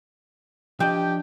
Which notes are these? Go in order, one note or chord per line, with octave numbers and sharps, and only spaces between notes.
F3 D4 G4 D#5 G5